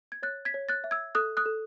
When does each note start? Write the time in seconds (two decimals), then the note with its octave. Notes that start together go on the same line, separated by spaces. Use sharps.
0.12 G#6
0.23 C#5 F#6 A6
0.45 G#6 B6
0.54 C#5
0.69 F#6 A6
0.84 E5
0.91 E6 G#6
1.15 A4 D#6 F#6
1.37 D#6 F#6
1.46 A4